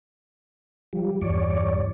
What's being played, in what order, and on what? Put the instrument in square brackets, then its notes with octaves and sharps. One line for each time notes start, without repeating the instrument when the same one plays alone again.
[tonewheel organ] F3 G3
E2 G2 C#5 D5